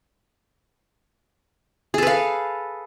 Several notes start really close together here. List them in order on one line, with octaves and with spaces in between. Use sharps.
G#4 A4 B4 F5